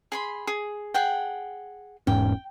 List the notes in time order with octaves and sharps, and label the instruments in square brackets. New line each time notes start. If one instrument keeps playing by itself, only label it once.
[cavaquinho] G#4 B5 C6
G#4
G#4 F#5 G5
[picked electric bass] E1 G#2 C#4 [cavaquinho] G5